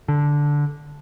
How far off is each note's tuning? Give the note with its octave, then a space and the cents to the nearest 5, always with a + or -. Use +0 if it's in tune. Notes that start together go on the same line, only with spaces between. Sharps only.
D3 -5